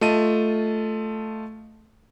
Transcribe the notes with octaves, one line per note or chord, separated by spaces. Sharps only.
A3 F4 D#5 A5 D#7